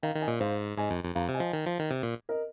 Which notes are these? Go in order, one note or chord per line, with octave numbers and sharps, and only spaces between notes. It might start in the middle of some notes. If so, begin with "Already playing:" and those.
D#3 F5 A#5
D#3
D#5 G#5
A#2
G#2 C5 F5
G#2 D#5 G#5
F2
F2
F2 F5 A#5
C3
D#5 G#5
F3
D#3
F3
D#3
C3
A#2
A#4 D#5